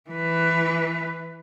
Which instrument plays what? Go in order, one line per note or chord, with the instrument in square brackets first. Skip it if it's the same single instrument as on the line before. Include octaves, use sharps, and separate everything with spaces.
[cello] E3 B4